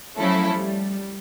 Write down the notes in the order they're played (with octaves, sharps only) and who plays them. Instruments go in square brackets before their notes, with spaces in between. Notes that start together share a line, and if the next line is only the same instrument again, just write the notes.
[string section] F3 A3 C#4 E4 A4 [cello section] F#3
[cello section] G3